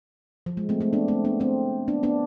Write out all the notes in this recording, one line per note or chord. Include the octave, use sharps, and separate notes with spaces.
F3
G#3
A3 C4
A3 C4
B3 D4
A3 C4
B3 D4
A3 C4
B3 D4
B3 D4